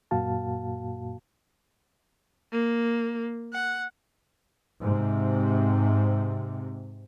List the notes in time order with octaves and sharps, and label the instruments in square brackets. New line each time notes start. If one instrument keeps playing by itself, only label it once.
[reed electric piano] F#2 A#2 A#3 F#4 F5 A5
[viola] A#3
F#5
[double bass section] G#2 C3